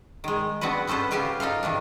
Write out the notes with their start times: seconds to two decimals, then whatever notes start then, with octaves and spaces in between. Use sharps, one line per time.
0.24 D#3 G#3
0.61 B3 C4 D4 F#4 B4
0.87 B3 C#4 A4 B4 C5
1.11 C#3 F4 G4 F5 A5
1.40 D#4 F4 A4 F5
1.63 C3 D#3 E3 D4